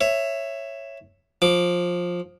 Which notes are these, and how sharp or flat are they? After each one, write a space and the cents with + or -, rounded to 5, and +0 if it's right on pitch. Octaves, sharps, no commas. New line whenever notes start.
C#5 -5 E5 +10
F3 +15 D6 +0